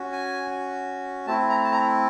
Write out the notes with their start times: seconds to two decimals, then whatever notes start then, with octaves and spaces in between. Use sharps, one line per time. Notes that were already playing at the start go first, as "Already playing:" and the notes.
Already playing: C#4 F#4
0.12 G#5
1.27 A3 C4 E4 A5
1.50 A#5
1.64 A5
1.72 A#5